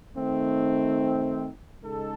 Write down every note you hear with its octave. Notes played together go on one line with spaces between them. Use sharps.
D#3 A3 C4 D#4
C#3 G#3 D#4 A4